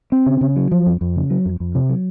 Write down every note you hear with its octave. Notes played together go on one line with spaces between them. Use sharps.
C4
C#3
C#3
F#3
F3
F2
F2
C#3
F#3
F2
F2
C3
F#3